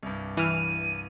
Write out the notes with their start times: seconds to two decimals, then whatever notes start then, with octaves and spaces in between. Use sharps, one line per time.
0.03 C2 G2
0.37 E3 F6 D#7